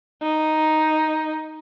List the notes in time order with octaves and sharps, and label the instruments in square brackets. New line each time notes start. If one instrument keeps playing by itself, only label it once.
[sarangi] D#4